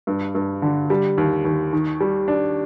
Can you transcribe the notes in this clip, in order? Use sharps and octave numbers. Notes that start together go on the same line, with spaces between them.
G2
G2
D3
G3
D#2
D#2
D#3
G3
D4